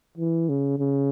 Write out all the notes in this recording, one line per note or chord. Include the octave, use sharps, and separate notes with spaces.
E3
C#3
C#3